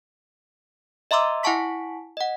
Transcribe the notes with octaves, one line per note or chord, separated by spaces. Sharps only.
D#5 E5 A#5 C6 D6 E6
E4 F#5 G#5 A5 C#6 B6
D#5 F#5